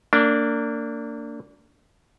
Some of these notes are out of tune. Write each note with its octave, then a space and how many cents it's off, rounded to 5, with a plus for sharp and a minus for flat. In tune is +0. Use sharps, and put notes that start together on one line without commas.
A#3 -30 D4 -15